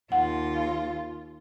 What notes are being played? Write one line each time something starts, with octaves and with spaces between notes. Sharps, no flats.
D#2 F4 F#5